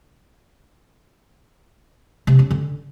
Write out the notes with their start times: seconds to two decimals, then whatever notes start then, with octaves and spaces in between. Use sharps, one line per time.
2.27 C3
2.39 C#4
2.51 D3